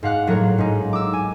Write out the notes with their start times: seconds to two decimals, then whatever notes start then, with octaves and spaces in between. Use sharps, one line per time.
0.03 G#2 F5 F#5 F#6
0.27 A2 F#3 A#3 A#4 C#5
0.58 G#2 D#4
0.93 D6 E6
1.13 G#5